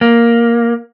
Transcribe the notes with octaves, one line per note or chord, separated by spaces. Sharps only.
A#3